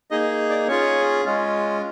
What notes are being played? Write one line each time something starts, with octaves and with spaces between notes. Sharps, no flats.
A#3 D#4 G#4 D#5
D5
C#4 F4 G#4 C#5
G#3 C#4 F4